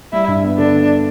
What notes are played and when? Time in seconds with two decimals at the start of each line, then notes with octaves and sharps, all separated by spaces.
0.13 G3 E4
0.28 G2
0.43 B3
0.58 D3 D4
0.74 G3